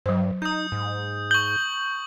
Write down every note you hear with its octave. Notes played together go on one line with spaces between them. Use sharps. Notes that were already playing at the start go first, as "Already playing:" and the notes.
G2 F#3 C5
D#4 D#6 G6
G#2
C#6 G6 F#7